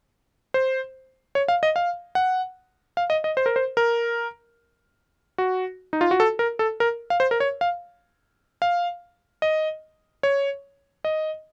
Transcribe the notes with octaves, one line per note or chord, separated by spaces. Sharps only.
C5
C#5
F5
D#5
F5
F#5
F5
D#5
D#5
C5
A#4
C5
A#4
F#4
D#4
F4
F#4
A4
A#4
A4
A#4
F5
C5
A#4
C#5
F5
F5
D#5
C#5
D#5